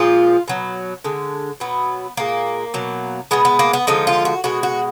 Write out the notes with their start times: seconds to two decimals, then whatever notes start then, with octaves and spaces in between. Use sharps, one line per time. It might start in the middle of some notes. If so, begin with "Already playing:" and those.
Already playing: A#2 F3 G#3 F4
0.48 B2 F#3
1.04 D3 G#3
1.60 B2 F#3 B3
2.17 A#2 G#3 A#3
2.74 B2 F#3
3.31 B2 G#3 B3
3.45 B3
3.59 A#3
3.73 B3
3.87 D3 F3 G#3 D#4
4.07 F4
4.25 F#4
4.44 B2 G#3 F#4
4.63 F#4